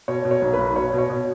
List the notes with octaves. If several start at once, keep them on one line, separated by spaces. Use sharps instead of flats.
B2 C#5
B2
C#5
B1
B4
B1
B2 C#5
B2
C#5
B2